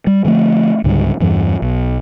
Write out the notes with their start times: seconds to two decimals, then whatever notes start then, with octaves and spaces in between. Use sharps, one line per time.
0.07 G3
0.25 D3 F3 G3 A3
0.84 C#2 G#2 D3 G3
1.20 E2 G2 E3 G3
1.62 B1